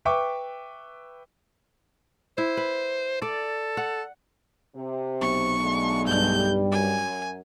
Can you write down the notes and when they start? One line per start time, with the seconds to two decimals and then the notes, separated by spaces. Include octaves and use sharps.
0.05 B4 E5 G5 C#6 D6
2.38 E4 C5
2.57 B4
3.22 A4 D5
3.77 F#5
4.76 C3
5.21 B1 C#6
5.60 D3 G#3 A3
6.07 G2 G3 G6
6.72 F#2 G#5